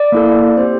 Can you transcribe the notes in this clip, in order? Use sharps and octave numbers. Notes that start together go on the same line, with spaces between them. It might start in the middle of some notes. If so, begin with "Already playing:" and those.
Already playing: D5
A#3 E4 A4
C4 G4 C5